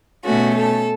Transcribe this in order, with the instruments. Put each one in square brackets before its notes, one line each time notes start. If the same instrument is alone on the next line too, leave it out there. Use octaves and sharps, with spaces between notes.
[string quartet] B2 A3 C#4 F#4
A4